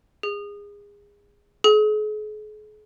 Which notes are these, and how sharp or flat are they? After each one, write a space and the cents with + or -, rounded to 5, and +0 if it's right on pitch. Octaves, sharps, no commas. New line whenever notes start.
G#4 -25
G#4 +40